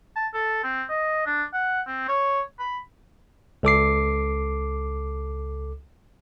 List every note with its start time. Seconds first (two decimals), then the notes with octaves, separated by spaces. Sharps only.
0.16 A5
0.34 A4
0.64 C4
0.89 D#5
1.26 D4
1.53 F#5
1.87 C4
2.08 C#5
2.59 B5
3.63 C#2 A4 D6 C7